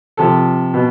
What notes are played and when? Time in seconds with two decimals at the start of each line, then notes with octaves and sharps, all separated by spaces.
0.17 C3 F3 A4
0.74 B2